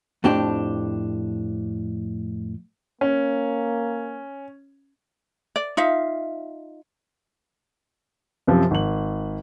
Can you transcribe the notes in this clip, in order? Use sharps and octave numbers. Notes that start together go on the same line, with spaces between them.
F2 A2 C4 D4 G4
A#3 C#4
D5
D#4 F4 E5 F5
F#2 C3 F3
G#1 F#7